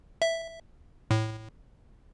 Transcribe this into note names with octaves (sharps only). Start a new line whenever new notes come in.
E5
A2